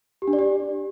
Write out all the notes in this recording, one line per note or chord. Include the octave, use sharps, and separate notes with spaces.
G4
D4
D5
G4